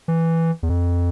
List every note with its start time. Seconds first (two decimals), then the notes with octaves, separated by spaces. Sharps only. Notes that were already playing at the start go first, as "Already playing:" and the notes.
0.08 E3
0.63 E2
0.69 F2